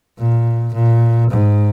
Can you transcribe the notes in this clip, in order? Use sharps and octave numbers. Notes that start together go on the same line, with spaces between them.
A#2
A#2
G#2